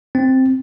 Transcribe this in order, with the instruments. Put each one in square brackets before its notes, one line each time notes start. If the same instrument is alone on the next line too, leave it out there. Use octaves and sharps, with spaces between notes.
[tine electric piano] C4